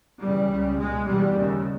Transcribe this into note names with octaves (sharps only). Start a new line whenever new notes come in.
E2 C#3 G3
C#2 C#3
C#2 B2 G#3
E2 B2 G3
D#2 C#3